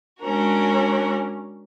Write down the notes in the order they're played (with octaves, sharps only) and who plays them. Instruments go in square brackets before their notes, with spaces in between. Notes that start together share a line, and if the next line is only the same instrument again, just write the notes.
[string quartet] G#3 C#4 D4 F#4 A#4